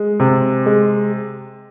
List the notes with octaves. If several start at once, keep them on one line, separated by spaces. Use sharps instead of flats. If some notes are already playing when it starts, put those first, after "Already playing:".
Already playing: G#3
C3
G#3